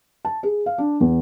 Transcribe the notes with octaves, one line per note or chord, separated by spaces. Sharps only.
A5
G#4
F5
D4
E2